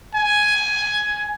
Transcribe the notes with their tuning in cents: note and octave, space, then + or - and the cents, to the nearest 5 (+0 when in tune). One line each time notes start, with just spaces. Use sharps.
G#5 +10